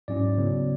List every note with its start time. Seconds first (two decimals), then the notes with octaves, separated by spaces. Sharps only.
0.08 G#2 F#3 C#4 E4 D5
0.37 C#3 F#3 B3